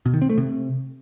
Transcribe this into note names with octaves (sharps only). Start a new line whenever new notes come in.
B2
D#3
C4
A3
C3